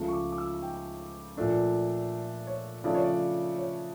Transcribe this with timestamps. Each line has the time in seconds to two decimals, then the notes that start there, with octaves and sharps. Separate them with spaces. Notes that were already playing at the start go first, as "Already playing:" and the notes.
Already playing: C#2 C#3 F3 A3
0.08 C#6
0.13 D6
0.32 D6
0.38 E6
0.63 G5
1.37 A#2 F3 A3 D4
2.47 C#5
2.84 C#3 F3 A3 D4 D5
2.95 C#5
3.04 D5
3.58 C#5